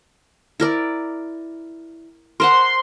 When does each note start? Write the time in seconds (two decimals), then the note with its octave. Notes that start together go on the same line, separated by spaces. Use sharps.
0.60 E4 A#4 D5
2.40 A#4 C5 F#5 C6